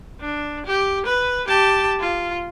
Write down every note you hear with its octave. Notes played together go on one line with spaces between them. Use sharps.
D4
G4
B4
G4 A5
F4